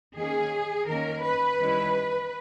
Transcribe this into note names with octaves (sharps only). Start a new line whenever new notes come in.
D#3 A#3 C#4 G#4
D#3 A#3 C#4 A#4
B4
D#3 G3 C#4 E4